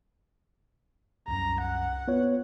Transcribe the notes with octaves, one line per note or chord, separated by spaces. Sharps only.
C2 F#2 A#5
F#5
B3 F4 C#5